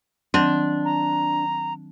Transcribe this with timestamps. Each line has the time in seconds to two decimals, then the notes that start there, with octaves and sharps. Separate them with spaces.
0.34 D#3 F#3 C4 D4
0.85 A#5